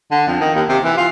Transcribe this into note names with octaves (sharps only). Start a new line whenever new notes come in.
D3
F2
D#3
D#2
C3
E3
F4